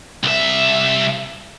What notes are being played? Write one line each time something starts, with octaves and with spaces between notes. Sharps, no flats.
C2 E5